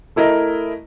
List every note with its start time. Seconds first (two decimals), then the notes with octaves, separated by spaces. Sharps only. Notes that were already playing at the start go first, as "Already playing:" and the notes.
0.16 A3 E4 A#4 D#5